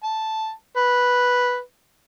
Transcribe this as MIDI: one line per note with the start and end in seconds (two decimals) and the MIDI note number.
0.03 0.51 81
0.77 1.59 71